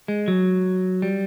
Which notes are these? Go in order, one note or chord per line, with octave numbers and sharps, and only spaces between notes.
G#3
F#3
G3